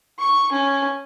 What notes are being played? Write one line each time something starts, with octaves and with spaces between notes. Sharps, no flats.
C#6
C#4